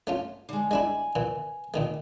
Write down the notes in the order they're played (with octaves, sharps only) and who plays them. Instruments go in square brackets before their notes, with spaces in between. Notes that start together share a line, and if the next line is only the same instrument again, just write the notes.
[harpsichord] A3 C#4 F4
[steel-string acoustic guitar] D3 G#3
[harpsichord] G#3 D4 E4 [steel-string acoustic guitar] G#5
[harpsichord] A#2 E3
A#2 D#3 A3